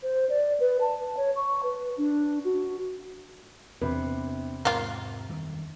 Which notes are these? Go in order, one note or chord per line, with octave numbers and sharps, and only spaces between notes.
C5
D5
B4
A5
C#5
C#6
B4
D4
F#4
E2 C3 B3 D4 B4
G#2 A#3 F4
F#2 D#3 G3